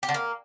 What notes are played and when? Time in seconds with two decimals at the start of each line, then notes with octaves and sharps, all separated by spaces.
0.03 G4
0.09 D3
0.14 A#3